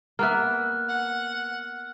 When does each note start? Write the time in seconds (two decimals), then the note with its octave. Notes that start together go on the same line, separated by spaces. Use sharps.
0.19 A#3 B3 E5 F6 F#6
0.88 F#5